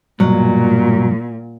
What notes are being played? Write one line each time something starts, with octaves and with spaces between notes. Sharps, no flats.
B1 G2 A#2 F#3